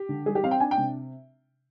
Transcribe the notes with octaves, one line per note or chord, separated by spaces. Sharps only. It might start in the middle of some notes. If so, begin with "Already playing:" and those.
Already playing: G4
D3
G3 G#4
G4
C4 F5
G5
D4 G#5
G5
C3